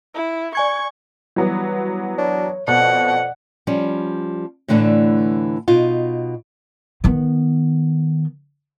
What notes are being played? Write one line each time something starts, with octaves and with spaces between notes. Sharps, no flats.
E4
D5 G#5 C#6 G#6
E3 F#3 G3 B3
D4 C#5
F2 B2 D5 F#5
F3 G3 C#4
A2 D3 E3 A3 D4
B2 D#4 F4
D#3 B3